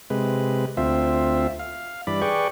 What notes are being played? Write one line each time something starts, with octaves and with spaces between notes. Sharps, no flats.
C3 G#3 B4
D2 C4 F4 E5
F5
G2 E3 D5 B5
G#4 B4 D5 G5 C#6